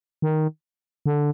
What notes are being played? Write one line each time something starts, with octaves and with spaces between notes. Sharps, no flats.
D#3
D3